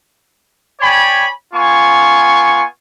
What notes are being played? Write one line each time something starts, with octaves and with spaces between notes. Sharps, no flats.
C#5 D5 G5 G#5 B5
B3 F4 G#5 C#6